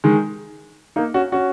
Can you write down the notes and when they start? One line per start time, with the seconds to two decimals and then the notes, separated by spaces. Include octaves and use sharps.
0.04 D#3 G#3
0.96 A#3 D#4
1.14 C#4 F#4
1.32 C#4 F#4